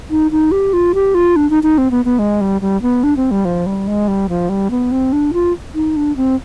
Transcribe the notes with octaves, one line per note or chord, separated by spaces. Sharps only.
D#4
D#4
G4
F4
G4
F4
D4
D#4
D#4
C4
B3
B3
G#3
G3
G3
B3
D4
C4
G3
F3
G3
G#3
G3
F3
G3
B3
C4
D4
F4
D#4
D4
C4